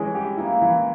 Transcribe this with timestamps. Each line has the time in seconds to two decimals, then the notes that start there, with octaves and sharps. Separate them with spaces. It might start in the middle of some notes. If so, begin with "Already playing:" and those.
Already playing: E3 G#3 C#4
0.15 G4
0.37 A#3 E4
0.62 E3